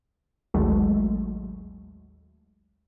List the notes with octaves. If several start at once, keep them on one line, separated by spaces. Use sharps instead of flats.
A1 D#2 F#3 G#3 A3